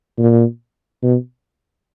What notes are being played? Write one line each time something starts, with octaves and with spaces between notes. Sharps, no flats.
A#2
B2